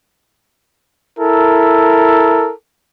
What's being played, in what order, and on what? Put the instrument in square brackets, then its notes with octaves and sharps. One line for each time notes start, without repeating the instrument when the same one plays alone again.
[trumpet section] E4 A4 A#4